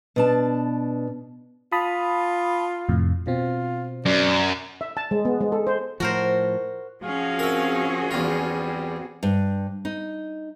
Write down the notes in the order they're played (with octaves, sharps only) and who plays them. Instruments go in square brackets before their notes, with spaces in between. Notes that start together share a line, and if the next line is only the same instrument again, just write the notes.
[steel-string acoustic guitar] B2 D4 A5
[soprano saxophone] F4 [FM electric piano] A5 B5 D#6
[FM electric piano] F2 A2 C3
[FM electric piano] B2 C4 [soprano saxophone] F4
[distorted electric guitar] F#2 [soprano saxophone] D5
[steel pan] E5
A5
G#3
B3
G#3
A4
C5
[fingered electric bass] A2 F3 [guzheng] F#4 A#4 C5
[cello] F3 C#4 [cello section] C4 F#4 G#4 [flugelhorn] F5
[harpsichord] A#4 E5
[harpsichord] E2 F4 [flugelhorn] G3
[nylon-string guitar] G2
D#4